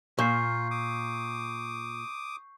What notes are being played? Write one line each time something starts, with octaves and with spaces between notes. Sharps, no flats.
A#2 F4 C#6 G6 C7
D6 D#6